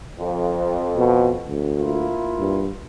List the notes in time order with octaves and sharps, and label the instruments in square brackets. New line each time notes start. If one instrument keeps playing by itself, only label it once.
[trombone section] F2
[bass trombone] B2
D2
[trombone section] A#3 E4 F4
[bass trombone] G2